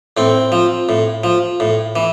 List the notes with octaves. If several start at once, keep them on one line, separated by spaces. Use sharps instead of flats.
A2 C4
F3
A2
F3
A2
E3